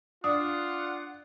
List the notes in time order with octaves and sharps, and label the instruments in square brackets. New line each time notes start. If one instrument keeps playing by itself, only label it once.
[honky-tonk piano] D4 [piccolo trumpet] F4 [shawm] F#5 [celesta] D#6